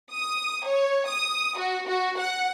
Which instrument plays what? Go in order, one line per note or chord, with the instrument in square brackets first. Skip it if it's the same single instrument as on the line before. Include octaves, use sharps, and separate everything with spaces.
[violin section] D#6
C#5
D#6
F#4
F#4
F#5